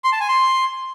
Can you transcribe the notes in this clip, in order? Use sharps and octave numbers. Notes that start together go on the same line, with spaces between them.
C6
A5
G#5
C6